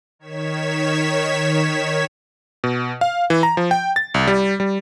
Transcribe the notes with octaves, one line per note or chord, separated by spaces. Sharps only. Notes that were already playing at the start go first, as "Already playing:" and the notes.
D#3 C#5 G#6 B6 E7
B2
F5
E3
A#5
F3
G5
A6
C2
G3
G3